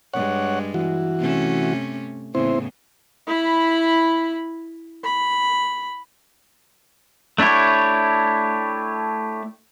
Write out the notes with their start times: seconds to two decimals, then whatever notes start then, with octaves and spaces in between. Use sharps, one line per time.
0.14 G2 G#3 C#5 F#5
0.74 E3 F#4
1.19 C3 A3 C#4
2.35 E2 A2 C#3 C4 E4 C5
3.27 E4 B5
5.04 B5
7.38 A3 D4 E4 G4 C#5